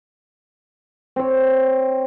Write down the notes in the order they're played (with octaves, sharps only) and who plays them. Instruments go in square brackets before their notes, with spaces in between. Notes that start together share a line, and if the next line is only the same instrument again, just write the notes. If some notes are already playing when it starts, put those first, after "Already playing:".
[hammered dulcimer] C4 C#5